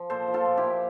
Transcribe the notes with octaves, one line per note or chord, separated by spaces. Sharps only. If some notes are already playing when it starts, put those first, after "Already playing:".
Already playing: F3
A#2 A4 C5
F3
F4 A4
A#2
E4 G4
A#2